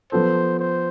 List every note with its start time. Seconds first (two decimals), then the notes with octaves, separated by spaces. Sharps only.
0.12 F3 B3 F4 A4 C5
0.59 C5